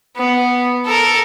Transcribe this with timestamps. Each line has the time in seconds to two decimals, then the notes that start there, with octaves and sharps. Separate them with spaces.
0.17 B3
0.86 A4 A#4